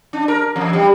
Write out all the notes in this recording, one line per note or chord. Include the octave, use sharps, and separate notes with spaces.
D4
A#4
E2
G3